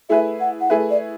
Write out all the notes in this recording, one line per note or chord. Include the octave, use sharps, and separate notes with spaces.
A3 E4 G#4 B4 E5
F#5
F#5
A3 E4 G#4 B4 E5
D5